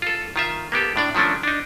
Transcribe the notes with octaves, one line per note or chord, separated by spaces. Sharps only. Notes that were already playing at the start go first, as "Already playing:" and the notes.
F4 A4
D#3 F4 E5
A#3 B3 G4 A4
A2 D4 D5
D#3 F3 A3 C#4 D4
D4 D#4